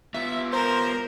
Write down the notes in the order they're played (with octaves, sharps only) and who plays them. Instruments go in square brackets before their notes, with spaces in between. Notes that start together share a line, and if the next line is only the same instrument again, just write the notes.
[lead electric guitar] B3 F4 [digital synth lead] E5
[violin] A#4 [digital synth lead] C5 [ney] A#5